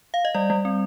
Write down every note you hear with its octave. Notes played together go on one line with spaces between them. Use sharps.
F5
D#5
G3 D5
G3
C4